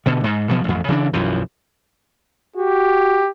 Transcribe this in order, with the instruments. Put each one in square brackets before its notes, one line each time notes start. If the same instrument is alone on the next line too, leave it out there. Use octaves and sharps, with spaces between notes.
[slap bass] B2 D3
G#2
B2 F3 F#3
A1 F2
C#3 E3 A3 D4
B1 F#2 E3 F3
[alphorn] F#4 [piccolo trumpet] G4